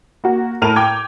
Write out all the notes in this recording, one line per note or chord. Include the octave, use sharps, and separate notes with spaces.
A#3 F#4
A2 A#4 A5 D#7 F7
G5 D6 G#6